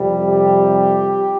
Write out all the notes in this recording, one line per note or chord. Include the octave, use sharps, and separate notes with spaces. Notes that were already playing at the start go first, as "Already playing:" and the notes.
Already playing: F2 C3 G3
G4